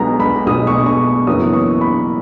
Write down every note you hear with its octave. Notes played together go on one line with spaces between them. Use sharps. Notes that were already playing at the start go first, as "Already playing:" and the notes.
Already playing: B1 B2 G#3 B3 A#5
B5
B1 B2 G#3 B3 D#6
C#6
C#6
F#1 F#2 E3 B3 D#6
C#6
B5